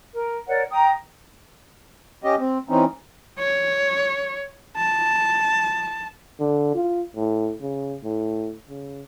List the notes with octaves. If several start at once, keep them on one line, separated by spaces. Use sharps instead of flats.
A#4
A#4 C#5 D5 F#5
G5 A#5 D#6
C#4 G4 D#5
C4
E3 C4 C#4 D#4
C#5
A5
D3
F4
A2
C#3
A2
C#3